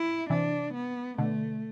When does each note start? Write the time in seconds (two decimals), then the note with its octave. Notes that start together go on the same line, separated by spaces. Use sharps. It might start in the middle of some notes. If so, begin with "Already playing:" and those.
Already playing: E4
0.30 C3 E3 D4
0.74 B3
1.18 B2 D3 A3